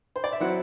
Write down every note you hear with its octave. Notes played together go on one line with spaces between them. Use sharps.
C5
D5
E5
F#3 C4 E4 F#5